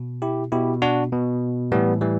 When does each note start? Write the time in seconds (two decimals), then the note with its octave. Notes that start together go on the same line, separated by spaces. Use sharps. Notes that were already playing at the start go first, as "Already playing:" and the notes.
Already playing: B2
0.22 E4 G4
0.52 B2 E4 G4
0.82 D4 F#4
1.12 B2
1.72 A2 E3 G3 B3
2.01 E3 G3